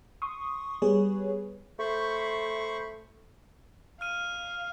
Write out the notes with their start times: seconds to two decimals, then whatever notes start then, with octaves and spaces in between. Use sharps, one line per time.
0.22 C6 C#6 D#6
0.82 G3 B3 G#4 B4 C#5
1.79 A3 C5 B5 C#6
4.01 F5 F6 D#7